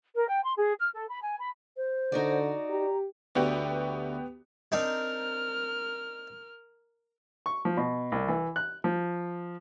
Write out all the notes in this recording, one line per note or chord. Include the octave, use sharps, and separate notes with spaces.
A#4
G5
C6
G#4
F6
A4
B5
G#5
B5
C5
D3 D#4 F#4 D5
G4 A#5
D2 B3 F#4 G4
C4 D4 D#4 A#4 F6
C#6
F3
B2
C2
E3
F#6
F3